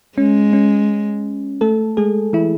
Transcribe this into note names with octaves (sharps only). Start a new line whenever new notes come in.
G#3 C#4
C#4
A3 A4
G#3 G#4
E3 E4